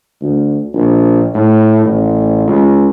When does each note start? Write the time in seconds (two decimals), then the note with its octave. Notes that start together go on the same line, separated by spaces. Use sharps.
0.21 D2
0.74 A#1
1.34 A2
1.85 A1
2.47 C#2